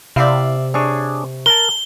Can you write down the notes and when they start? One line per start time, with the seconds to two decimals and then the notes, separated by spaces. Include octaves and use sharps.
0.16 C3 E4 D5 E5 F5
0.74 D4 G#4 C#5 C#6
1.46 A#4 A5 G7